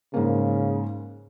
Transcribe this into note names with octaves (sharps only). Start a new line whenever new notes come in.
G#2 C#3 A#3